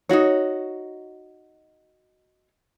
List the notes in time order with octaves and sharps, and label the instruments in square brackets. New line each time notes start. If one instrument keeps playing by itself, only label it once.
[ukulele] D#4 F4 F#4 C#5